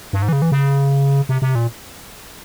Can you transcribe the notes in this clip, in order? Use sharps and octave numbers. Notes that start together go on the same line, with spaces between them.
G2
G#2
E3
C#3
E3
C#3
C3
C3
A#2